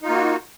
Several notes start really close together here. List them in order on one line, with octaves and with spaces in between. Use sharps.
D#4 F4 A#3 F#4